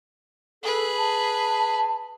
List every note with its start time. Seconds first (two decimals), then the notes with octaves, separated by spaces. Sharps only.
0.63 G#4 A4 B4
0.98 A5